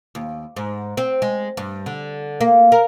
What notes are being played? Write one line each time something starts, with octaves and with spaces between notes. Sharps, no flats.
D#2
G#2
C4
G#3
G2
D3
A#3
A#4